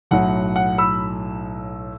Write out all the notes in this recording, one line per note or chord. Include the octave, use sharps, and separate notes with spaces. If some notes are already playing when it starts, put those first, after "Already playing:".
B1 A2 F#3 F#5
F#5
B5 E6